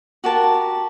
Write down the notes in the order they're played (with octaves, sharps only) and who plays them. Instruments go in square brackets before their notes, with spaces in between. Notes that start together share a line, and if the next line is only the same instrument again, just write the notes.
[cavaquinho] F#4 G4 A#4 A5